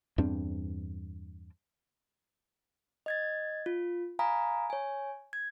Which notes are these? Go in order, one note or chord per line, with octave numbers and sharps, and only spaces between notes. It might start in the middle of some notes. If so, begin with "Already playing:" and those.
E2 G2 C4 D4
D#5 G#6 A6
F4
F5 G#5 A#5 B5 D#6
C#5 G#5
G#6